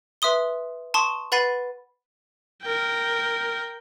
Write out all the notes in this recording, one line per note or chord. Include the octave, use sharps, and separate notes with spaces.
B4 E5 C6 D#6 G7
A5 C6 C#6 D#6
B4 F#5 B5 A6 C7 D#7
A#4 G5